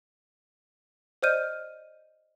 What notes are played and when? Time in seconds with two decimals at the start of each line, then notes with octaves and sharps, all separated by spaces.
1.23 C5 D5 D#5 F6 G6 D#7